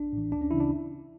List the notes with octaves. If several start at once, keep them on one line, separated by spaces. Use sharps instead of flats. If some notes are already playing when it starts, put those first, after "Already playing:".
Already playing: A1 D4
A2 E3
D2 D4
C#4
C#3 E3 E4
D4